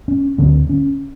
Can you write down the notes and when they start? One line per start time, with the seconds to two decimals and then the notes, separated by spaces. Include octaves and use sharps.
0.08 C#4
0.38 D2 D3 C4
0.69 C#4